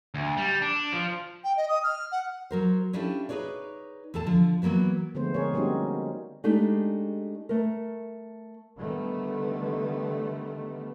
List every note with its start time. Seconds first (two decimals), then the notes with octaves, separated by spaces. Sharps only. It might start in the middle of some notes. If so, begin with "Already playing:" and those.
0.14 D2
0.37 G3
0.62 D4
0.93 F3
1.44 G5
1.57 D#5
1.69 D#6
1.84 F6
2.12 F#5
2.51 F#3 A#4 C5
2.93 C#4 D4 E4 F4 G4 A4
3.29 D#4 G#4 B4 C#5 D5
4.14 E2 A2 A4 A5
4.27 D3 F3
4.62 E3 F#3 A#3 B3 F#4
5.15 D3 F3 G#3 A3 B3 C5
5.34 D3 C4 G#4 A#4 C#5
5.54 G3 A#3 C4 C#4 D#4 F#4
6.44 G#3 A3 D4 D#4 G4 A4
7.49 A3 A#4
8.77 D3 D#3 G3 A3 B3